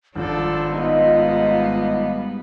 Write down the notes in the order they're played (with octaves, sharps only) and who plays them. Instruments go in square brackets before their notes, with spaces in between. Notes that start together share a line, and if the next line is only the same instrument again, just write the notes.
[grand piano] G#1 F3 [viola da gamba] D4 A4 [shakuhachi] F4
[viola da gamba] G#2 G3 B3 [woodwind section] D#4 D#5 F5